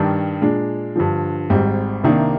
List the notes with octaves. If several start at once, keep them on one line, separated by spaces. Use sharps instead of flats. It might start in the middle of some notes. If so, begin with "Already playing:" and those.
Already playing: G2 D#3 G3 D4
A#2 G#3 D4
G2 D3 F3
G#1 G#2 G3 C4
C2 C3 D#3 A#3 D4